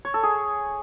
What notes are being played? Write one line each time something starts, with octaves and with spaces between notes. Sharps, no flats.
C#5
A4
G#4